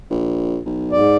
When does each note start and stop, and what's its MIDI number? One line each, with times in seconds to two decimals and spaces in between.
0.10 0.60 34
0.65 1.01 35
0.92 1.17 44
0.92 1.17 74